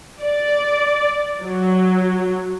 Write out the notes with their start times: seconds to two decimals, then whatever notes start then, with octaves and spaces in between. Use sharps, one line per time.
0.22 D5
1.43 F#3